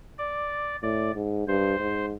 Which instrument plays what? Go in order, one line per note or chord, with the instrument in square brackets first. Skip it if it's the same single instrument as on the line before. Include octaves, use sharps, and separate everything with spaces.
[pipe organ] D5
[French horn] A2 [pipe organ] D5
[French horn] G#2
[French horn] G2 [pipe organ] C5
[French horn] G#2